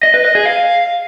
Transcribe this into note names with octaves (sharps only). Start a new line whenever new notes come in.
D#5
B4
D#5
G#4
F5